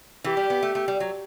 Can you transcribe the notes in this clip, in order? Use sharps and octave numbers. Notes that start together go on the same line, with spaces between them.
E3 G4
G3
B3
A3
A3
G3
F#3